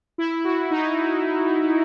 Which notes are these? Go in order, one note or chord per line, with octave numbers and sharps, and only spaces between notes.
E4
F#4
D#4